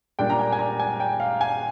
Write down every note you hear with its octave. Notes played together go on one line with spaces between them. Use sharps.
A#2 G3 D4 G5
A#5
G#5
G#5
A#5
G#5
G5
F5
G#5